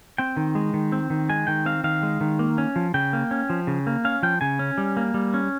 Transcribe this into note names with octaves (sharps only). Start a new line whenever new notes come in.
C4 G5
D#3
G#3
D#3
C4
D#3
G#3 G#5
D#3 G5
C4 F5
D#3 F5
G#3
D#3
A#3
C#4
F3
C#3 G5
A#3
C#4
F3
C#3
A#3
C#4 F5
F3 G5
C#3 G#5
C#4
G3
A#3
G3
C#4